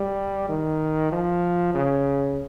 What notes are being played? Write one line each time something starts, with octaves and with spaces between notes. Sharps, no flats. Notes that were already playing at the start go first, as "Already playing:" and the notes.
Already playing: G3
D#3
F3
C#3